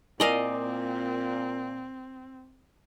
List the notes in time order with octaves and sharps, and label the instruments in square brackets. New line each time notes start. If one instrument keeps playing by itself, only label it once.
[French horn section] A#2 [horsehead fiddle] C4 [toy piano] E4 A#4 G#5 [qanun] D5 D#5 F5